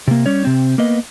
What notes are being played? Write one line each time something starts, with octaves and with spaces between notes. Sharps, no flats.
C3 A#3
G3 C#4 C#5
C3 C4
A#3 B3 D#5